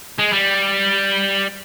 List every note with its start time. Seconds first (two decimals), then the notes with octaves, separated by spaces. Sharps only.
0.18 G#3
0.33 G3